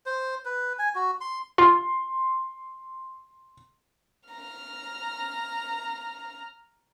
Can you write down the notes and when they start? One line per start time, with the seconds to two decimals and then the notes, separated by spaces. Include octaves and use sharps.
0.06 C5
0.45 B4
0.79 G#5
0.95 F#4
1.21 C6
1.58 F4 C6
4.29 A#5 F6